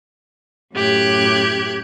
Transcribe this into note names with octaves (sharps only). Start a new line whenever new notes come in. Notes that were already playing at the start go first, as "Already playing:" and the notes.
F#2 A2 G4 F#6 G#6